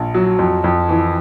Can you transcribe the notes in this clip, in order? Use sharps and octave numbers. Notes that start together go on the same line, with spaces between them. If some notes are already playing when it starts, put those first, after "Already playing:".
Already playing: A#1
F#3
F2
F2
E3